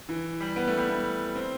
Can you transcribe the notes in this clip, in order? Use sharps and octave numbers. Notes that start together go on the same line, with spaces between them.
E3
G3
B3
A3
G3
A3
C4